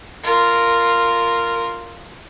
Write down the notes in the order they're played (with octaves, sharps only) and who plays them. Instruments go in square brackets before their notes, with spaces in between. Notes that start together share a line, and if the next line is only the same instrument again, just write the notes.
[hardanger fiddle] F4 A#4